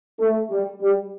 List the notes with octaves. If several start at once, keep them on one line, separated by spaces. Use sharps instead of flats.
A3
G3
G3